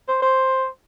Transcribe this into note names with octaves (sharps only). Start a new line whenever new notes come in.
C5
C5